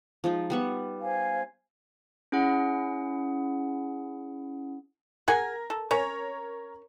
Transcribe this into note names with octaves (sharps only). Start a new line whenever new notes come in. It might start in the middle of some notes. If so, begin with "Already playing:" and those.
F3 G#3 D#4
G3 B3 C#6
C5 F5 G#5
C#4 E4 G#4 F#5
G#4 A#4 F#5 G#5
A4
C#4 A#4 C#5